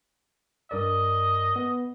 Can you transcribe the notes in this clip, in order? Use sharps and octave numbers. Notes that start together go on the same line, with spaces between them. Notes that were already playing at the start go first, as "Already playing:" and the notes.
G2 A#4 D5 D#5
B3